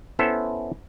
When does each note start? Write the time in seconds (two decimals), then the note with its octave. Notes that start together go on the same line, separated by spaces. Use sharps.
0.19 B3 C#4 E4 A4 C5 E5